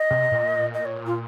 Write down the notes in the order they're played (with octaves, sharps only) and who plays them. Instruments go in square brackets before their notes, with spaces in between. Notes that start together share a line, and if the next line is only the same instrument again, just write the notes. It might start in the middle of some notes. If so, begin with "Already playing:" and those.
Already playing: [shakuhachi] D#5
[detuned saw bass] C3
A#2
[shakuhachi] D#5
C#5
F4